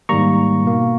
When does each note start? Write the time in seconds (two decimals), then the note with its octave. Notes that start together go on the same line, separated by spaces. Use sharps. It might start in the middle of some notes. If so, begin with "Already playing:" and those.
0.09 G#2 D#3 G3 A#3 A#5 C#6
0.64 B2 A#3